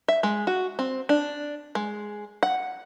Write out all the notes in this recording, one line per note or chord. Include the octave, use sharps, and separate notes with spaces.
E5
G#3
F#4
C4
D4
G#3
F#5